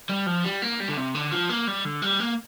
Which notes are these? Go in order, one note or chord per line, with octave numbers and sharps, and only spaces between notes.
G3
F3
G3
A#3
G3
D3
C3
D3
F3
A#3
G3
D3
G3
A#3